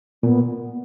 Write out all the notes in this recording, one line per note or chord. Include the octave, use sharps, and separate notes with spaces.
A#2 B3